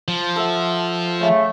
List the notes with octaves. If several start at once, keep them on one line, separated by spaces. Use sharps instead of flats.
F3
A4 E5 F#5
C#3 A3